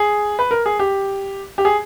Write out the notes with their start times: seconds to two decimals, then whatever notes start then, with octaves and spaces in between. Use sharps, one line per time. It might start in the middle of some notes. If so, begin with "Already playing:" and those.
Already playing: G#4
0.39 B4
0.51 A#4
0.66 G#4
0.79 G4
1.58 G4
1.65 G#4